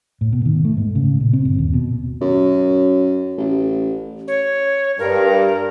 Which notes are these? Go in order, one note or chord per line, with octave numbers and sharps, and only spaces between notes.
A2
B2
D#3
A3
G#2
C#3
A#2
C4
G1
D#2
B2
F#2
A1
C#5
G2 A#4